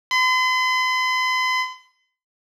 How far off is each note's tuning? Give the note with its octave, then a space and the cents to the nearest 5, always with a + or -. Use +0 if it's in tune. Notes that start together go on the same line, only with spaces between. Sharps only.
C6 -45